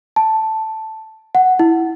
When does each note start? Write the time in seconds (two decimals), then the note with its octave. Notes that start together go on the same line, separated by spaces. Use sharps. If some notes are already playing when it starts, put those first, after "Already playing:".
0.16 A5
1.35 F#5
1.59 E4